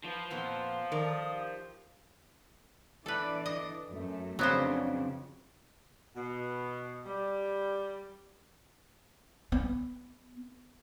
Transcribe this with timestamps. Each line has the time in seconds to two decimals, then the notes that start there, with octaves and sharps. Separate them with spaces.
0.04 F3 B4
0.30 F2 A#2 B3 C6
0.92 D#3 A4 A#4 D5 D#6
1.31 G4
3.06 E3 D4 A4 B4 D5
3.46 D#5
3.89 F#2 A3
4.39 F2 C#3 F#3 B3 D4 C5
6.16 B2
7.05 G3
9.52 B3